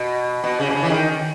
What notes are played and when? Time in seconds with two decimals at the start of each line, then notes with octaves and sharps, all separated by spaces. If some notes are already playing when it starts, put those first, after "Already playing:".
Already playing: B2
0.44 B2
0.60 C#3
0.70 B2
0.75 C#3
0.83 E3
0.90 D#3